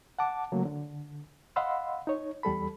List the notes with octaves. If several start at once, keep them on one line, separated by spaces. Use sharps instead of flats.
F#5 A5 D6
C#3 F#3 A3 A#3
D3
D#5 F5 F#5 B5 C6 E6
D#4 C#5
E2 G3 A4 B5